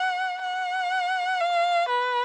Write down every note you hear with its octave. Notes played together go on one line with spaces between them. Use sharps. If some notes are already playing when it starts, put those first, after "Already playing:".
Already playing: F#5
F#5
F5
B4